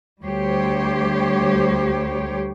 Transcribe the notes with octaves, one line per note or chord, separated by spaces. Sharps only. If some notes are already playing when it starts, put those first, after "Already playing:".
D2 G3 G4 C5 C#5